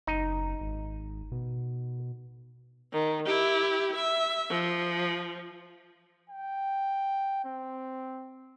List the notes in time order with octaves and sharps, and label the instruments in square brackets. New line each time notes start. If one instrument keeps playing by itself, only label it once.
[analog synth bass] F#1 [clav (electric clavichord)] D#4
[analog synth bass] G#1
B2
[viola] D#3
E4 G4
E5
F3
[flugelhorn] G5
C4